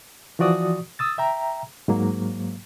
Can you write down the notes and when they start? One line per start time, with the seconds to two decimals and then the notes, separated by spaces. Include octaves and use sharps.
0.39 E3 F3 F#4 D5 D#6
0.99 D#6 E6 A6
1.18 E5 G5 A#5
1.88 G#2 F#3 A#3